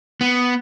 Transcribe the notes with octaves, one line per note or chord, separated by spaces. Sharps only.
B3